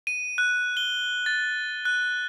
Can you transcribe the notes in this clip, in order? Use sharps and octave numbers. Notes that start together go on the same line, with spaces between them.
D#7
F#6
G7
A6
F#6